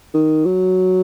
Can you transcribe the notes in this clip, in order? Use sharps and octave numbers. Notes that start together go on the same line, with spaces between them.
D#3
F#3